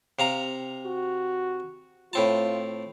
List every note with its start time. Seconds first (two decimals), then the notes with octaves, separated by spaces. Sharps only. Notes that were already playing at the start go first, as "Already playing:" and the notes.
0.19 C3 F5 A#5
0.86 F#4
2.13 A2 C4 F4 A5